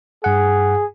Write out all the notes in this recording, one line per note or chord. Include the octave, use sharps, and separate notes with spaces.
G2 G#4 F#5